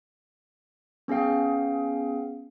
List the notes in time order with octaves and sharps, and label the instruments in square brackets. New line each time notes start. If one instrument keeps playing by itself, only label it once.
[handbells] B3 C#4 G#4 F5 G5